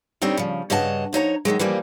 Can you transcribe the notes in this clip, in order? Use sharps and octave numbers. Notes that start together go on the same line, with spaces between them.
D2 G3 C4 D#4 C#5 G5
C#3 F3
G2 C#3 C#5 D#5 F#5 A5
F3 D#4 C#5 A#5
D#3 F3 F#3 G#3
E3 F3 G3 A#3